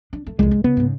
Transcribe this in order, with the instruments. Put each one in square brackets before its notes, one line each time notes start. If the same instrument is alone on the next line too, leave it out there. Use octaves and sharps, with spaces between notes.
[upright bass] D4
A3
[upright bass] C2 F2 [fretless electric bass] G#3
[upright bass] G#2
[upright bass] C#3 [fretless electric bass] B3
[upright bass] G#2 C#3